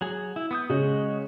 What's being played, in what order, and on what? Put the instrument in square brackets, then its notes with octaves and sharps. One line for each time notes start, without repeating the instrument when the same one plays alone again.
[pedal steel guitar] F#3 G#4
E4
B3 D#6 G6
[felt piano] C#3 [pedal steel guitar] G#3 F#4 D#5